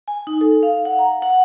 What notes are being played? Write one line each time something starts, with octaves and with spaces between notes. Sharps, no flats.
G#5
D#4
A4
F5
F#5
A#5
F#5